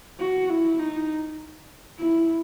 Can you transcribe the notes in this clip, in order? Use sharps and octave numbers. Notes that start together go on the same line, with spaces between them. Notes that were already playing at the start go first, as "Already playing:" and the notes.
F#4
E4
D#4
E4